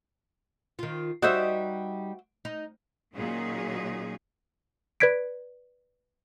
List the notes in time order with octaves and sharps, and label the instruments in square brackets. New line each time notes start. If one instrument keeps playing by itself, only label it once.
[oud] D#3 F4
[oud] G3 D#4 D#5 [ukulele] F#4 C5 E5
[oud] D#4
[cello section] A#2 D#3 F#3 C#4 D#4 G#4
[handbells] B4 D5 G#6 B6 D7